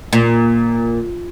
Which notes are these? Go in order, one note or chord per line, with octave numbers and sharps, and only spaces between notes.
A#2